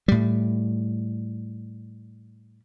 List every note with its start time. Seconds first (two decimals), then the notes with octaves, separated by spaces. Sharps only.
0.08 A2 G3